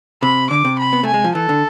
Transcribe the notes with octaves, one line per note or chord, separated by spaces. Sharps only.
C3 B5
D3 D6
C3
B5
B3
A3 G#5
G#3
F3
E3 A4
D3